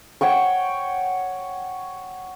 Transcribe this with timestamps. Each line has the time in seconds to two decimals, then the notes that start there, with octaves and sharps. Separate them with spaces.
0.21 C#5 F#5 G5 C#6